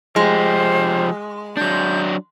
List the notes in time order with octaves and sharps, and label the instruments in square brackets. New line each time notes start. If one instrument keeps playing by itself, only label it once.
[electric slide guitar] F3 G4 [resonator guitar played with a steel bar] G#3 [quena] C5
[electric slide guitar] F#3 D4 [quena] G6